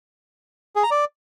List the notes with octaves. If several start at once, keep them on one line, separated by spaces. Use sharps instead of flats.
G#4
A#5
D5